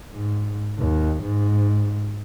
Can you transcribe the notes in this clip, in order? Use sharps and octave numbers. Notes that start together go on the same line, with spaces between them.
G#2
D#2
G#2